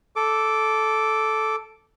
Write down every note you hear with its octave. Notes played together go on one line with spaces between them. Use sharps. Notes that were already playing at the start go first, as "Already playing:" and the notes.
A4 D6